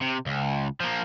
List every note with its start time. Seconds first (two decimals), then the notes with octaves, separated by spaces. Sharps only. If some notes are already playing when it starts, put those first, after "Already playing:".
0.01 C3
0.26 C#2
0.80 F3 A#3